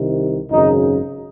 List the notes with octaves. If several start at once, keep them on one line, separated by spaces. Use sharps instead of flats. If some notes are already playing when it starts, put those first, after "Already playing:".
Already playing: C2 C3 D#3
G#1 F#2 C#3 D#4